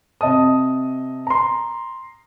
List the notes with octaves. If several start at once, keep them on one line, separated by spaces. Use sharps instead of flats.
C3 D#5 A5 D#6
A#5 C6